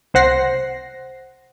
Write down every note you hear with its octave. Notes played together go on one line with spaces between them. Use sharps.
C2 C5 F#5 A#6 C7